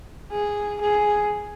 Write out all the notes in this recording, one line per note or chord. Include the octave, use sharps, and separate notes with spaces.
G#4
G#4